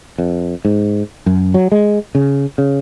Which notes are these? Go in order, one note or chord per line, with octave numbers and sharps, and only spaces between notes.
F2
G#2
F#2
F#3
G#3
C#3
C#3